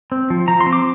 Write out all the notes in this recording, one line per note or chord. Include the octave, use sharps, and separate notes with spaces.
C4
F3
F3 A#5
C6
C4
D6